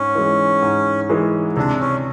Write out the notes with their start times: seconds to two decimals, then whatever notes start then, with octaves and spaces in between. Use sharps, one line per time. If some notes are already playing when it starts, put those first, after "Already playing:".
Already playing: G#2 C#4
0.15 E3 G#3
0.63 G#2
1.09 E3 G#3
1.57 C3 D4
1.80 C#4